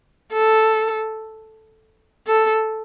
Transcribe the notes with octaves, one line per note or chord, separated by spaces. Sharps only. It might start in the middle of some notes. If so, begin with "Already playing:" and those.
A4
A4